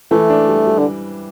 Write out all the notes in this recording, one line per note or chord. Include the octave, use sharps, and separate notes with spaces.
E3 A3
D4
G3
G3
D3